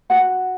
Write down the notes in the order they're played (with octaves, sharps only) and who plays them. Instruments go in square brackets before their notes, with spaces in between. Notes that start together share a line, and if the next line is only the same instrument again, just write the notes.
[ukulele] F#4 B4 F#5 A5